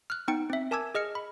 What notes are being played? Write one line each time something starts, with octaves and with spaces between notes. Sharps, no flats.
F6 F#6
B3 D#4 G5 C#7
C4 E5
A#4 G#5 A5 D6 E6 G#6
G#4 D#5 F6 C#7
B5